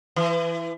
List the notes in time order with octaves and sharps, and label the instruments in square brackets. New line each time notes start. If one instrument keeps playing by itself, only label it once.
[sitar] E3